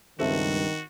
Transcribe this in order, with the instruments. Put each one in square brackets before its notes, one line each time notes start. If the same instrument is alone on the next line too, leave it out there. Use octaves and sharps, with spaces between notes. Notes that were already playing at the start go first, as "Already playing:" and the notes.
[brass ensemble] C#2 G2 [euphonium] D#3 [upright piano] C4 A4 E5 [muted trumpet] F#4